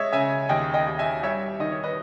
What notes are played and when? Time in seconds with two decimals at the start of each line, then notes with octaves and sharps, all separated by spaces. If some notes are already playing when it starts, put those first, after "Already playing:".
Already playing: G#3 C#5 D#5 E5
0.13 C#3 E5 G#5
0.49 D#2 D#5 G5
0.74 D#5 G5
0.87 D#2
0.99 E5 G#5
1.23 G3 C#5 E5
1.60 D#3 D#5
1.71 C#5
1.84 B4 D#5